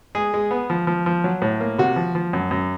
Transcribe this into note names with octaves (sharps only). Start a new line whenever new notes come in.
G#3 G#4
G#3
B3
F3
F3
F3
F#3
A2
A#3
C3 F#4
F3
F3
F#2
F#2